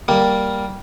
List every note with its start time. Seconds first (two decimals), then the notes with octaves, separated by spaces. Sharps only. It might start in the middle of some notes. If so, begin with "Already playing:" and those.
0.08 G3 A#3